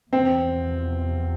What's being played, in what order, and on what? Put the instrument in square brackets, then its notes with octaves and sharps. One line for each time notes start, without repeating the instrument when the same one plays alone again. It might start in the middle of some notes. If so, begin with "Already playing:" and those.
[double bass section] E2 C3 F3 [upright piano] C4